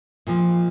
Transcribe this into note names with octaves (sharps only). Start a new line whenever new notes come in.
A#2 F3 G#3